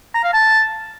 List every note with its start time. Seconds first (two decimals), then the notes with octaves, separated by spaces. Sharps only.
0.14 A#5
0.24 F5
0.33 A5